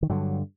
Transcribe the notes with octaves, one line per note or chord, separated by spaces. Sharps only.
D#3
G2 D3 F#3